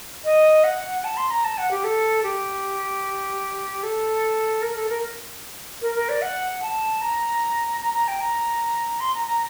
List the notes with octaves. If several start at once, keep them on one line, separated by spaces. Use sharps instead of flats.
D#5
F#5
A5
C6
A#5
A5
F#5
G4
A4
G4
A4
A#4
A4
A#4
A#4
A#4
D5
F#5
A5
A#5
A#5
A#5
G5
A#5
C6
A#5
A#5